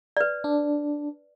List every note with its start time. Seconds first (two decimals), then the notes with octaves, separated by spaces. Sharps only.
0.17 B4 D5
0.44 D4